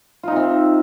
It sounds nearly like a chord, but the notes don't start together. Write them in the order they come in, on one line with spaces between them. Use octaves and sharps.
F4 D#4 C3 C4